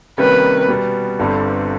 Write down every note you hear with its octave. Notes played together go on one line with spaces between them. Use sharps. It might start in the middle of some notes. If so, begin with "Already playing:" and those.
C3 D#3 G3 A#3 C#4 B4
B2 G3 B3
G1 G2 D3 G3 C4